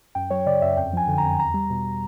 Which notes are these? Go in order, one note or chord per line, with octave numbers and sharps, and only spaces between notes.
F#2 G5
F#3 C#5
C#3 D5
F#2 E5
F2 G5
F3 G#5
D3
F2 A#5
E2 A#5
G3
B2